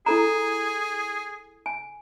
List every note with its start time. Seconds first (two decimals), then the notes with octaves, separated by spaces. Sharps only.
0.06 E4 G#4 A4 A#5
1.66 G#5